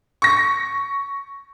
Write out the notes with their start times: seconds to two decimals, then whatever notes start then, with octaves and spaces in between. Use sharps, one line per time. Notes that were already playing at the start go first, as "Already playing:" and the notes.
0.22 C#6 A#6